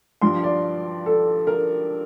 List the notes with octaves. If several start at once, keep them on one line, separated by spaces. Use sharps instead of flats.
G2 F3 C6
D5
A4
A#4